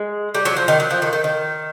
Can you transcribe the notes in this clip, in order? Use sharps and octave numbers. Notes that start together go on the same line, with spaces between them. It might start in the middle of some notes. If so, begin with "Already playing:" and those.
Already playing: G#3
G3
F#3
F3
D#3
F#3
F3
D#3
D#3
D#3